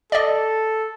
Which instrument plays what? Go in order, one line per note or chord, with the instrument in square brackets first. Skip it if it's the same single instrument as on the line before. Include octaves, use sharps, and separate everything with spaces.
[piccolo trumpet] A4 [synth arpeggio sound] D5 D#5